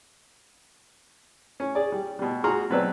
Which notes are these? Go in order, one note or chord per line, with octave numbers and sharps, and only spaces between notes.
C#4
G#4 D5
G3
B2 G3
F#4 G#4 A#5 C6 F6
B2 F#3 C4 B4 D5 E6